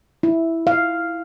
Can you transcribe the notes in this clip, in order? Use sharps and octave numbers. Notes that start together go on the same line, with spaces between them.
E4
F5